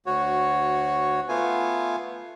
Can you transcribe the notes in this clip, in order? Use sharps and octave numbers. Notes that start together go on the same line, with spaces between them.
D2 F#4 C#5
A3 B3 F4 G#5